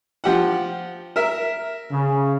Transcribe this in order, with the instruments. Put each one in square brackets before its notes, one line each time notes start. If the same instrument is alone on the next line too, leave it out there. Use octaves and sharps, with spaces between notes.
[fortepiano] F3 G4 F#5
A#4 E5
[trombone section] C#3